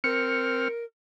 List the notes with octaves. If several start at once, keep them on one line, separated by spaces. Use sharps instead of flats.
C4 A#4 F6 C#7